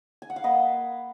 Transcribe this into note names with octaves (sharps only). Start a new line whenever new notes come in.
G#5
F#5
F5
A#3 B4 D#5